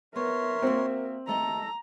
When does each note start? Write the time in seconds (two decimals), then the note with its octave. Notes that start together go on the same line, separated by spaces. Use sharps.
0.16 B3 A#4 C#5 E5 C6
0.62 A#3 C4 F#4
1.27 D#2 A3 A4 D#5 A#5